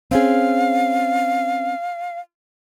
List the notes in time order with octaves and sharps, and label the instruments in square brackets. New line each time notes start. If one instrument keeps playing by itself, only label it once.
[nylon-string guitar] C4 C#4 G#4 [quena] F5